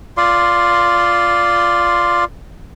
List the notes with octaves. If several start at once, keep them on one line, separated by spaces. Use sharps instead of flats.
F4 D5 C6